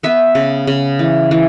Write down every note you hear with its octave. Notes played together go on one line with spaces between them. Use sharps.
B3 E5
C#3
C#3
E3
E3